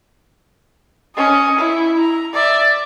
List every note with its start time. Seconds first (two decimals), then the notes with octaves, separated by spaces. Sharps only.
1.15 C#4 D#5
1.59 E4
1.98 A#5
2.33 D5 E5